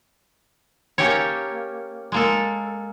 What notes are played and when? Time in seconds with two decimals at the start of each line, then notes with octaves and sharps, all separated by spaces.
0.98 A#3 C#4 G4 A4 C#5
2.12 G#3 A#3 A4